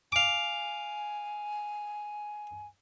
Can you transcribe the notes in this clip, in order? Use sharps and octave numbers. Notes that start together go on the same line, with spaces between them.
F5 G#5 D6